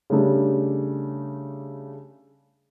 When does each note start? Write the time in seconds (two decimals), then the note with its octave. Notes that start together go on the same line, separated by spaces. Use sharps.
0.10 C#3 G3 A3 D4